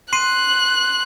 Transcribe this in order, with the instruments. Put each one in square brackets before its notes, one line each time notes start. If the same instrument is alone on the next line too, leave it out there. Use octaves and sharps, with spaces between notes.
[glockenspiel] C6 C7 D#7 [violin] F#6